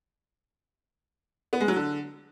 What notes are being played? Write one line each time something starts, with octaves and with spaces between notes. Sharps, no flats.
B3
G#3
F#3
D3